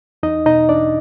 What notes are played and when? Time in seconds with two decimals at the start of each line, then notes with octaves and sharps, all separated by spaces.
0.23 E2 D#4 D#5
0.46 B2 D#4 D#5
0.69 E2 D4 D5